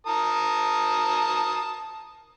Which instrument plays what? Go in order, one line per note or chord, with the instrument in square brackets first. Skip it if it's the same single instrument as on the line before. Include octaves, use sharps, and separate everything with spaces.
[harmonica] A#4 A5 D#6